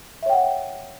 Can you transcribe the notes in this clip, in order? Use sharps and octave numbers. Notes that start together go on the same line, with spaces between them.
C#5 E5 F#5 G5